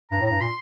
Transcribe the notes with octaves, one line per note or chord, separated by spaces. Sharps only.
G2 A#5
A2
A#5
G2
A#2 C6